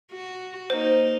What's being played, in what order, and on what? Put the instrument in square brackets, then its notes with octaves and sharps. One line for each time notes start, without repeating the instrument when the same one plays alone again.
[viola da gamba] F#4
[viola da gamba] A#3 D#4 [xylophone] C5